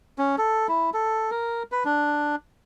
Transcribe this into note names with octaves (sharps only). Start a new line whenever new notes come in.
C#4
A4
E4
A4
A#4
B4
D4